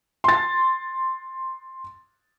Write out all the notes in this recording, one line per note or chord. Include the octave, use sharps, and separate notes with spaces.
C6 A6